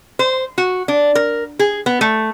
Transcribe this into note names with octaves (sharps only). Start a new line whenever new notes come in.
C5
F#4
D4
A#4
G#4
B3
A3